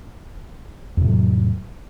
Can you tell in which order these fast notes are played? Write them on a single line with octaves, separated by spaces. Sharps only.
F2 C3 A2 F#3